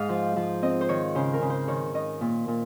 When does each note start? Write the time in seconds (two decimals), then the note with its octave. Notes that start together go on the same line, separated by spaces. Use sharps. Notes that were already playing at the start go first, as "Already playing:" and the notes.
Already playing: G#2 D#5 F5
0.09 F3
0.36 F3
0.62 C4 D#5
0.81 C5
0.89 D#3 C#5
1.15 C#3 C5
1.33 A#4
1.41 C#3
1.50 C5
1.68 D#3 C#5
1.94 D#3 D#5
2.21 A#2
2.48 A#2